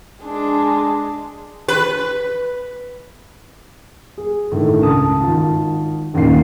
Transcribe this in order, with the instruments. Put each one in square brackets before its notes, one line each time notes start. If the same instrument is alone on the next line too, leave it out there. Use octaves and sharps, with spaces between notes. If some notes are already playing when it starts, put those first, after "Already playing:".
[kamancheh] G#3 D4
[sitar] B4
[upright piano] G#4
A2 D3 D#3
C#2 A#4 A5 D#6
G#1 F4 A5
A1 D#2 A#2 C#4 C7